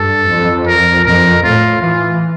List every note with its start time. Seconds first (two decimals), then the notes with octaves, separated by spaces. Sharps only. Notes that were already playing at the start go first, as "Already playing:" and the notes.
Already playing: G2 A4
0.29 F2
0.67 A#4
1.05 F2 A#4
1.44 A2 F4
1.82 E3 F4